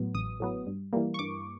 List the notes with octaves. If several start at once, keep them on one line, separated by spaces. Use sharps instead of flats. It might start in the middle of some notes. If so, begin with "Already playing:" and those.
Already playing: A2 F#3 B3
A1 D#6
A2 F#3 B3
G2
E3 G3 A#3
C#6
G2 D6